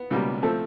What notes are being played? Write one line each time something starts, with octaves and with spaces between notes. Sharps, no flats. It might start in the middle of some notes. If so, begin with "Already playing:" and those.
Already playing: B3
C#2 B2 G3 A#3
F3 A3 C4 A4